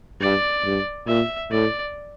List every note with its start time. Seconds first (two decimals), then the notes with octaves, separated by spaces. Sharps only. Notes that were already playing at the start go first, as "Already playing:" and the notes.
0.21 G2 D5
0.65 G2
1.08 A#2 E5
1.51 A2 D5